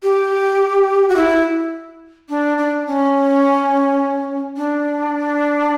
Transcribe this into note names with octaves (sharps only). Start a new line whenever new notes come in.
G4
F#4
E4
D4
D4
C#4
D4